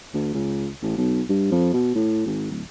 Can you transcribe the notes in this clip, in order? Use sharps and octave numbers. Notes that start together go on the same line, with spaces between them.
D2
C#2
A1
B1
G2
F2
B2
A2
G#1
D1